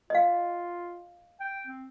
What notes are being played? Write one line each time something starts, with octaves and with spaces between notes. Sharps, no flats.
F4 D#5 F5
G5
C4